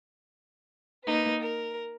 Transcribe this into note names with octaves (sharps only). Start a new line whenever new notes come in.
A#3 D#4 B4
A#4